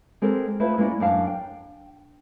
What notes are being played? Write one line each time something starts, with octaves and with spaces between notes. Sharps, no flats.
G#3 C4 G4 A4 A#4
A3 E4 F4 B4 C5 E5
G#3 A#3 C#4 E4 D5
F#2 D4 F5 A5
G5